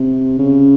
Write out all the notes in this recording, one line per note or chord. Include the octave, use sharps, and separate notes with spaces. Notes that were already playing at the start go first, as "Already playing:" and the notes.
Already playing: C3
C#3